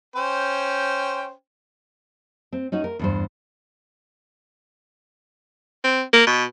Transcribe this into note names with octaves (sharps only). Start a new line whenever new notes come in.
C#4 C5 G5
C4
C#4 D#4 F#4
A#4
E2 G2 C5
C4
A#3
B2